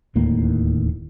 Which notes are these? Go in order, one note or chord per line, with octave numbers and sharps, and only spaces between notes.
D1 D#2 A2 A#3